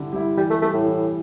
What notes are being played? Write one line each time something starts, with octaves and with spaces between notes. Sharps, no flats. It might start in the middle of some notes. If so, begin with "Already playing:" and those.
Already playing: D3 G3 E4
G3 E4
E3 G3
A3
G3 A3 E4
A2
E3